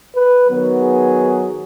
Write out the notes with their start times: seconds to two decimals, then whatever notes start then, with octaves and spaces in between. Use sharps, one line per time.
0.15 B4
0.47 D#3 F#3 B3
0.79 G#4